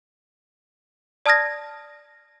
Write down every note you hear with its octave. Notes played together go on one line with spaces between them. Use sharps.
D5 A5 D#6 F6 G#6 A#6